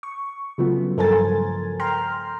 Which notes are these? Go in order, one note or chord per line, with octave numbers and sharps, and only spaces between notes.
C#6
C#3 F3 F#3 A3 B3
G2 A4 A#4 C5 G#5 A6
G5 A#5 C6 F6